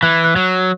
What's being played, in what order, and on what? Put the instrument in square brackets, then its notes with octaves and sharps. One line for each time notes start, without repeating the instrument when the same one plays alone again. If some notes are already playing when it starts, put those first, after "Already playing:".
[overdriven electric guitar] E3 [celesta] F#6
[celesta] F#6
[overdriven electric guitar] F#3